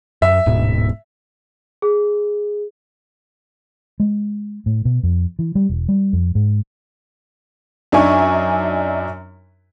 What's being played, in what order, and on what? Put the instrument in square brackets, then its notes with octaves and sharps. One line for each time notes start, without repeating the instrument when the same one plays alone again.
[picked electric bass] F#2 [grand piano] E5
[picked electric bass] D1 G#2 B2
[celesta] G#4
[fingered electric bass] G#3
A2
B2
F2
E3
G3
E1
G3
F2
G#2
[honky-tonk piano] F#2 D4 D#4 E5 G#5 C#6